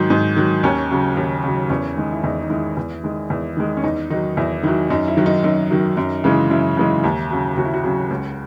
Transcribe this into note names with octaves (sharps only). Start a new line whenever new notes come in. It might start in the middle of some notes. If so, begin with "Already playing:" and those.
Already playing: G#2 D#3 F#3
G#2 D#4
D#3 F#3
D#2 C#4
C#3 F#3
D#2
C#3 F#3
E2 C#4
D#3 G#3
E4
E2 D#4
D#4
D#3 G#3 E4
E2
D#3 G#3
E2
D#3 G#3
C#4
E2 D#4
D#3 F#3 D#4
E2 E4
D#3 F#3 E4
F#2 D#4
E4
D#3 F#3
D#4
F#2 D#4
D#3 F#3
F#2
C#3 E3 G#3
F#2 E4
C#3 E3 G#3
D#2
C#3 F#3
D#2 F#4
E4
F#4
C#3 F#3
C#2